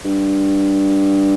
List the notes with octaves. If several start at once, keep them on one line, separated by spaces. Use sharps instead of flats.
G2